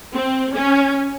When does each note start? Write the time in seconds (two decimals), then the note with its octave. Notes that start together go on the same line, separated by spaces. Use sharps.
0.13 C4
0.54 C#4